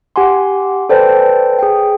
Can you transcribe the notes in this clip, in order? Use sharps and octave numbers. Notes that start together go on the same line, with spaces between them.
G4 F#5 G#5 C6
A4 B4 C5 D5 G5 A5
G#4 G5